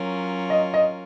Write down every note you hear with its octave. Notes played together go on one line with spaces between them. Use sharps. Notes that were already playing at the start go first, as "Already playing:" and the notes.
Already playing: F#3 C#4 F4 A#4
D#5
D#5